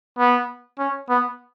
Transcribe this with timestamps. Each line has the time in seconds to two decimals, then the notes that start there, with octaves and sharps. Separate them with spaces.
0.19 B3
0.79 C#4
1.09 B3